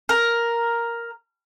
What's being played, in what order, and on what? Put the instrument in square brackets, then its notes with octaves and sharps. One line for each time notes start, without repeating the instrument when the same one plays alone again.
[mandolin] A#4